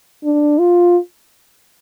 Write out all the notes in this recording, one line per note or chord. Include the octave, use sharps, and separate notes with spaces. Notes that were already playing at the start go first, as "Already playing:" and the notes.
D4
F4